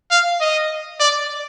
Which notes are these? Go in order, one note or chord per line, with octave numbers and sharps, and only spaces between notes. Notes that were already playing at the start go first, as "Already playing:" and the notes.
F5
D#5
D5